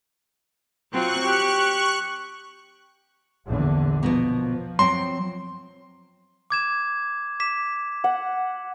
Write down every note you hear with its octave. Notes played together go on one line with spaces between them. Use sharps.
F#3 C4 F4 C#6 F#6
G4
A#1 E2 D3
B2 F3 A#3 B3
F#3 C4 G5 C6
D6 G#6 E7
D6 B6 E7
F#5